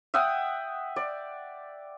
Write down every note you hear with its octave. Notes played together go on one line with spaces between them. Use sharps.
E5 F#5 G5 D#6
D5